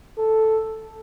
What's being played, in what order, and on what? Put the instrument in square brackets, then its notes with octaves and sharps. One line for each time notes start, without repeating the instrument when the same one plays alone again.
[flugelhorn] A4